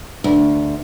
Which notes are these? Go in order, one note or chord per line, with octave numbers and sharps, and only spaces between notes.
D2